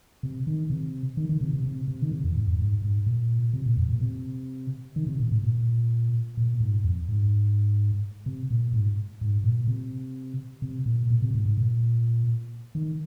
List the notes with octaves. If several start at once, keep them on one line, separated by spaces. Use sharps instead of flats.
C3
D#3
C3
D#3
D#3
C3
C3
C3
C3
D#3
C3
F2
G#2
F2
G#2
G#2
A#2
C3
A#2
F2
A#2
C3
D#3
C3
A#2
G#2
A#2
A#2
G#2
F2
G#2
C3
A#2
G#2
G#2
A#2
C3
C3
A#2
A#2
C3
G#2
G#2
A#2
D#3